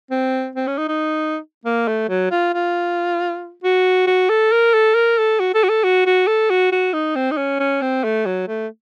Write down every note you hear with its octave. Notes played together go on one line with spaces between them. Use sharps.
C4
C4
C#4
D#4
D#4
A#3
A3
F#3
F4
F4
F#4
F#4
A4
A#4
A4
A#4
A4
F#4
A4
F#4
A4
F#4
F#4
A4
F#4
F#4
D#4
C4
D#4
C#4
C#4
C4
A3
F#3
A3